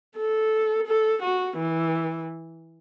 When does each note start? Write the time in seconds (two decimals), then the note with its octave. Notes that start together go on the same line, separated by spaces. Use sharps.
0.17 A4
0.87 A4
1.22 F#4
1.58 E3